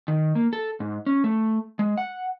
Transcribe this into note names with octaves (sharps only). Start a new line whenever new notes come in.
D#3
A#3
A4
G#2
C#4
A3
G#3
F#5